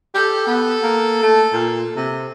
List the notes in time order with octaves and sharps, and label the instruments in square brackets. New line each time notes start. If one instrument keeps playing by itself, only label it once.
[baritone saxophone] G4 [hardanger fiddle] A4
[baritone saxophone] B3
A#3
A3
A#2
C3